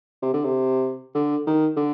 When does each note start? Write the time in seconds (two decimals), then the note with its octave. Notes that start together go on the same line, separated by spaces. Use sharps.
0.22 C3
0.33 D3
0.45 C3
1.15 D3
1.47 D#3
1.76 D3